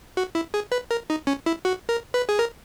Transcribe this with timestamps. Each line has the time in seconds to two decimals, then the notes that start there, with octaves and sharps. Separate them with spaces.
0.17 F#4
0.35 E4
0.54 G#4
0.72 B4
0.91 A#4
1.10 D#4
1.27 C#4
1.46 E4
1.65 F#4
1.89 A#4
2.14 B4
2.29 G#4
2.39 A#4